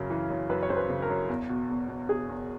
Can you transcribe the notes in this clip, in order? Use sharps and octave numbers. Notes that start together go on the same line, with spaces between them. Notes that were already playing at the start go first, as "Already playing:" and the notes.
Already playing: F#2 C#3 A#4
E3
F#2
F#2 B4
C#5
F#2 C5
B4
C#3
A#4
F#2
E2
B2
E2
B2
B2 G#4
E2